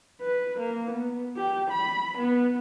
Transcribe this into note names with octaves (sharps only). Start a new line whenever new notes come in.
B4
A#3
B3
G4
B5
B3